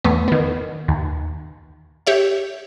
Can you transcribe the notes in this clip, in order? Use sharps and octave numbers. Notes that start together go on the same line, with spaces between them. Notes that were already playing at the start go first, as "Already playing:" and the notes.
E2 A2 B3
D#3 B3
D#2
G4 C#5 E5